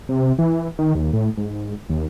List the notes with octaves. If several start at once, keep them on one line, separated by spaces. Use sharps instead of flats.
C3
E3
D#3
D#2
A2
G#2
D#2